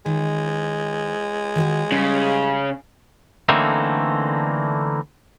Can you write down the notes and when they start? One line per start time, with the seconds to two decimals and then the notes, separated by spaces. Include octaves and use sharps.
0.06 D#3 G#3
1.56 D#3 F#4 C#5
1.92 C#3 G3
3.49 D3 E3 A3 A#3 C4 D#4